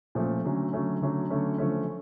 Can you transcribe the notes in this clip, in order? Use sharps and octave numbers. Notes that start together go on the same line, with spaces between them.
A#2 F3 A3 C#4
D3 F#3 A3 C#4
D3 F#3 A3 C#4
D3 F#3 A3 C#4
D3 F#3 A3 C#4
D3 F3 A3 C#4